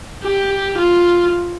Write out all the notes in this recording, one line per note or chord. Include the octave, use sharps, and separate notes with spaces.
G4
F4